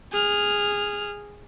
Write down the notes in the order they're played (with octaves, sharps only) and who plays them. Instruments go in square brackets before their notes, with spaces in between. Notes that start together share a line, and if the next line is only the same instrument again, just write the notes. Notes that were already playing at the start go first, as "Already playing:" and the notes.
[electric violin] G#4 F6